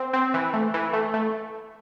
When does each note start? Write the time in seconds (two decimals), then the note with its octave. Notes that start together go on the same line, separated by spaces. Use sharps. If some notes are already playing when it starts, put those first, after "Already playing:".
Already playing: C4
0.13 C4
0.34 E3
0.54 A3
0.74 E3
0.93 A3
1.14 A3